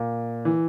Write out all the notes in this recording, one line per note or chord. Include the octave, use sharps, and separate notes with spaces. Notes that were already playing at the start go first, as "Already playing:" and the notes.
Already playing: A#2
E3